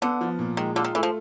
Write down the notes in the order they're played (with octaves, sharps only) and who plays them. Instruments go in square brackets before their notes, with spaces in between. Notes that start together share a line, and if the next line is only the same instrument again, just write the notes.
[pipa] D3 [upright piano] B3
[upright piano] F3
A#2
[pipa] D#3 [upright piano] G#3
[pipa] D3 [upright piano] F4
[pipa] D#3
[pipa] E3 [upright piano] A3
[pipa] F3